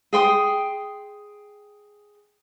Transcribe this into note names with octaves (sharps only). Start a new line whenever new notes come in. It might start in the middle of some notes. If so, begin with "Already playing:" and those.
G#4 G5 C6 D#6